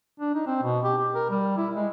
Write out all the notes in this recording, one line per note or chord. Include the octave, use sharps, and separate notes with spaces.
D4
D#4
C4
B2
G4
G4
A#4
G3
E4
G#3